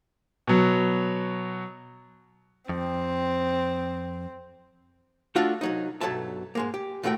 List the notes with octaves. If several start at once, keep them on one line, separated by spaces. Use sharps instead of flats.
B2 F#3
F2 C4
A3 D4 F4 F#4 A4
C2 F#3 D#4
B1 G2 F#3 A4 E5 A5
G#2 G#3 A#3
G4
D#2 A2 A3 F#4 G5